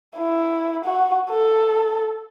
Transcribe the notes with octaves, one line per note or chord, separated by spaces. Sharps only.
E4
F#4
A4